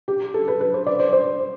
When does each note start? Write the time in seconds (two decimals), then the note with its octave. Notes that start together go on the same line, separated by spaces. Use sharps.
0.08 G4
0.34 A4
0.48 B4
0.61 B4
0.74 C5
0.86 D5
1.00 C5
1.13 C5